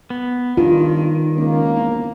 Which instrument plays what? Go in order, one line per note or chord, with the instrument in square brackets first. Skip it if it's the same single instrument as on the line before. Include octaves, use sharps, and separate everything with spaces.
[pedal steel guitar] B3
[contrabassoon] G2 [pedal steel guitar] D#3 [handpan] F4
[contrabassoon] C#2 [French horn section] A#3
[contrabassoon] E1